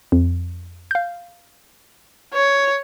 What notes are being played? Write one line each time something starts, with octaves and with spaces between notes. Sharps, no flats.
F2
F5 G6
C#5